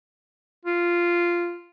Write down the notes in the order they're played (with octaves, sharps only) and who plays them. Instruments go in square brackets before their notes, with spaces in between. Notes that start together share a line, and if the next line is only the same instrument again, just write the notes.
[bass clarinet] F4